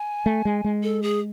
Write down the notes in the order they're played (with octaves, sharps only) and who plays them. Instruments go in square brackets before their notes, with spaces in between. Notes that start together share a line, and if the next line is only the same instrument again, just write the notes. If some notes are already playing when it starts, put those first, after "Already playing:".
Already playing: [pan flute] G#5
[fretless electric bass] A3
G#3
G#3
[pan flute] A4
G#4